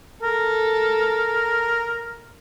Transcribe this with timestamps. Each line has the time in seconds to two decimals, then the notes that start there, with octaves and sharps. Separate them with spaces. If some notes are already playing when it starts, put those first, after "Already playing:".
0.23 A4 A#4